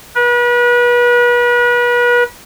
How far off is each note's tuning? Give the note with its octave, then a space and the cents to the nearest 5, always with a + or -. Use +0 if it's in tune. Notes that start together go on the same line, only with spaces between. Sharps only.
B4 -35